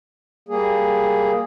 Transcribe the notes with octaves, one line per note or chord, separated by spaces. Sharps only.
G3 A#3 G#4